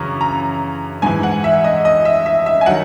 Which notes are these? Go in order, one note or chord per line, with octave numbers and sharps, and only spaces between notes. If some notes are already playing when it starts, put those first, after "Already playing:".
Already playing: F#2 C#3 E3 A#5 C#6
A#5
G#2 E3 G#5
F#5
E5
D#5
D#5
E5
E5
E5
G#5
D#3 F#3 F#5